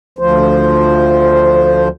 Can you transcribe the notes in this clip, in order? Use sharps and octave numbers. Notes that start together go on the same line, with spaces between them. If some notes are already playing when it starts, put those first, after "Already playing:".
D2 F3 C5